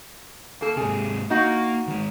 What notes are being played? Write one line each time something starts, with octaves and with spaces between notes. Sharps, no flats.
A#3 A4
G#2 C3 G#4
A#3 D#4 F#4 F5
D#3 G#3